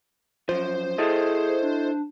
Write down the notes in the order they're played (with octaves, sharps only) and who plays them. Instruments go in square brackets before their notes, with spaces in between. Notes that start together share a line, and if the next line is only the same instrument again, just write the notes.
[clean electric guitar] F#2 F3 [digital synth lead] C5
[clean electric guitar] E4 A4 D#5 [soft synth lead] G#4
[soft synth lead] D4